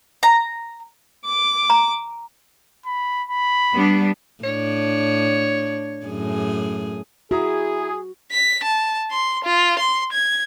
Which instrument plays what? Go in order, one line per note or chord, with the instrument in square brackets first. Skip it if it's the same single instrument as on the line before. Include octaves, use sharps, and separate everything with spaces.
[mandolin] A#5
[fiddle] D6
[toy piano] A#5
[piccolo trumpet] B5
B5
[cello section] G3 B3 D4
[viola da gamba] A2 D4 [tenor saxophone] C#5
[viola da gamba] F#2 A2 G#4
[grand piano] E4 A#5 D#6 [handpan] F#4 [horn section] G#4
[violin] B6
A5
C6
F4
C6
G#6